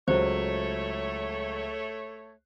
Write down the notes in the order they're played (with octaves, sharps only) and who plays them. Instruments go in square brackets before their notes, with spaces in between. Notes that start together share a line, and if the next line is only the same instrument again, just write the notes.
[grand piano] C#2 F#3 [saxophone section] A3 C#5 [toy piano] C5